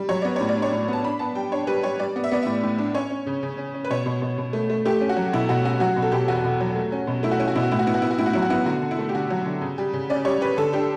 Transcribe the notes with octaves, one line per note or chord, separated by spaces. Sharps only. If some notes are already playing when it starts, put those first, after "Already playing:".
Already playing: G3
F#3 C#5
B3 D5
A2 C#5
D5
D4
C#5
A2
B3 A5
D4 B5
B3 A5
G3 G5
D4 C#5
G3 B4
G3 C#5
G3 D5
B3
E5
B3 D5
A2 E5
A2
D4
C#4 C#5
C#4
C#3
C#3
C#4
C#4
B4
B2 C#5
B2
B2
B2
A3
A3
A3 G4
C#4
F#4
F#3
B2 E4
B2 F#4
C#4 F#4
F#3 F#4
B2
A4
B2 G4
E2 F#4
B2
F#3
A3
C#4
B2
A3 E4
F#4
C#4 E4
F#4
B2 E4
F#4
A2 E4
F#4
B3 E4
F#4
B3 E4
F#4
A2 E4
F#4
F#3 E4
F#4
B3 E4
D3 F#4
D3
E4
A3
G4
D3 F#4
F#3
D3
C#3
G3
C#3
C#4 D5
G3 C#5
G3 B4
D3 A4
D4 G4